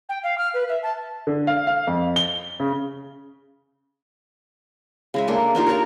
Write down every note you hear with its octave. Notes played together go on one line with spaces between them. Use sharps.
G5
F5
F6
B4
E5
A5
D3
F5
F5
F2
G7
C#3
C#3 G#3 E5
A#3 D4 A4
D4 D#4 F4 G4
A#4 C#5 A5 A#5